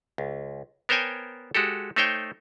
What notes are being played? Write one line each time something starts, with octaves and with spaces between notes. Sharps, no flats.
C#2
B3 A#4 C5 C#5 G5 G#5
G#3 F#4 G4 A4
A3 D#4 C5 C#5 G5